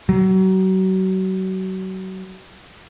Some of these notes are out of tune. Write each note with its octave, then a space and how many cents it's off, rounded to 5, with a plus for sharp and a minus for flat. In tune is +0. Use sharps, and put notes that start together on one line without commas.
F#3 +30